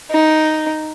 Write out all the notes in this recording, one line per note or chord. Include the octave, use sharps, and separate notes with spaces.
D#4